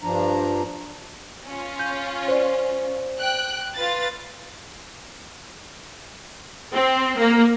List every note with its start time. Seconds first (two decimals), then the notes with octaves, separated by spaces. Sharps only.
0.03 G2 F3 D4 A#5
1.46 C#4 F4
1.79 G6
2.28 C5 D5
3.19 G5 F#6
3.75 F4 B4 A6
6.73 C4
7.18 A#3